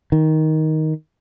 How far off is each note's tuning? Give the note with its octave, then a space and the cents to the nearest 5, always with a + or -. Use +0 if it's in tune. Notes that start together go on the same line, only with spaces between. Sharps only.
D#3 +10